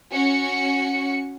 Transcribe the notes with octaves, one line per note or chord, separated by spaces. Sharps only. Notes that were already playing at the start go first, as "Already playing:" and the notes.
C#4 F#4 C#7